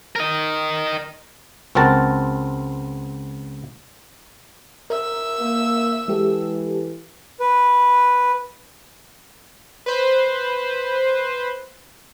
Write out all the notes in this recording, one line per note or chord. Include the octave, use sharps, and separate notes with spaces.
A#4 D#5
C#2 C4 F#4 A#4 A5
A#4 E5 E6
A#3
E3 G#3 G4 A4
B4
B4 C5